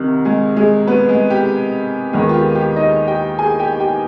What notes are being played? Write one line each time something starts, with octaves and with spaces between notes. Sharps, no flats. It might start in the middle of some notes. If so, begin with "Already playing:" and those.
Already playing: C2 C3 D#3
G#3 G#4
G#3 G#4
B3 B4
G#3 G#4
G4
D#2 D#3 G#3 B3 G#4
F4
G4
G4
D#4 D#5
G4 G5
G#4 G#5
G4 G5
G4 G5